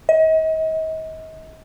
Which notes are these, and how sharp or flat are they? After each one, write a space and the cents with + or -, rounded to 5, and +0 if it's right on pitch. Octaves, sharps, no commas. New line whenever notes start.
D#5 +40